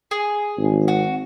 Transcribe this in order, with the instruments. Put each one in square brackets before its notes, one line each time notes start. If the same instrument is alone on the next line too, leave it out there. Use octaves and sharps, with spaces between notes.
[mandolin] G#4
[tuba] G#1
[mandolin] F#4